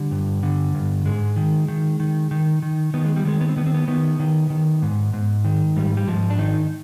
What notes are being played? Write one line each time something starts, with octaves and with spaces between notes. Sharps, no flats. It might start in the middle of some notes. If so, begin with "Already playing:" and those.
Already playing: D3 G3
G2
D3
G2
G#2 G#3
D#3
D#3
D#3
D#3
D#3
D#3 B3
G#3
G3
D#3 G#3
B3
C4
D#3 B3
C4
B3
D#3 B3
D#3
D#3
G#2
G#2
D#3
G#2 G3
G3
G#2 F3
D4
D#3 D#4